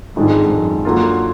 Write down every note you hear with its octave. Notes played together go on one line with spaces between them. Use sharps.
F2 G#2 D#3 G#3 D4
F#2
D3 F#3 A#3 F4